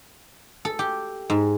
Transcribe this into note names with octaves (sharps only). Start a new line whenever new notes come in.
A4
G4
G#2